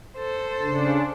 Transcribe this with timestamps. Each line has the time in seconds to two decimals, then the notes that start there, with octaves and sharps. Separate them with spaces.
0.17 A4 C5
0.61 C#3 D4